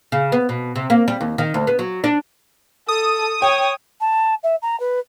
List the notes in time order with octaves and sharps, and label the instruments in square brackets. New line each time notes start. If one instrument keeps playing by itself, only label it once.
[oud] C#3
B3
B2
C3
A#3
G3
D#2
D#3
D2
B3
F#3
D4
[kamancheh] A4 [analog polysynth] D#6
[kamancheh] C#5 [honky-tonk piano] G5
[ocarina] A5
E5
A#5
B4